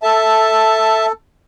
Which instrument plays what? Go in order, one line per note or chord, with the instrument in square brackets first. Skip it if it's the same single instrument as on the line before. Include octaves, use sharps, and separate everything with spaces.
[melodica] A4 [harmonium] E5 A5